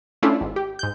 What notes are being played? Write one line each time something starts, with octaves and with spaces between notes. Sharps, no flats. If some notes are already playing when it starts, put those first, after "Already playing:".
A3 C#4 D4 E4 F4 A4
G#1
G4
G#2 G6